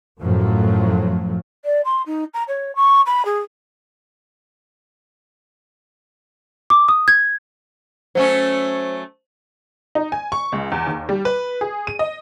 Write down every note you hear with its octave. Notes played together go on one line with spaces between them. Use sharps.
F#2 A2 F3 F#3
D5
C6
D#4
A#5
C#5
C#6
B5
G#4
D6
D#6
G#6
F#3 A3 C#4 C5
D#4
G#5
C#6
C#2
E2
D#2
G3
B4
G#4
D#7
D#5